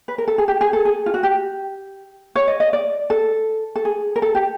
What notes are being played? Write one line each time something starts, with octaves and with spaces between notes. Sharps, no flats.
B4
A#4
A4
G#4
G4
G#4
A4
G#4
F4
F#4
G4
C#5
D#5
D#5
D5
A4
A4
G#4
A#4
A4
G4